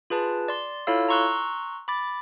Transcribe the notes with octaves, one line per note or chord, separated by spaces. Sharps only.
F4 G#4 B4 A5
D5 C6
E4 F4 A4 C#5 F5 E6
A#5 C6 C#6 E6 F#6
B5 D6 A6